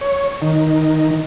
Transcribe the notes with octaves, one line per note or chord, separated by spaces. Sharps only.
C#5
D#3